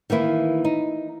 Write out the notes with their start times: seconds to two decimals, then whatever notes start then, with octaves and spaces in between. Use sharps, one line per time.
0.10 D#3 E3 A#3 E4
0.65 D#4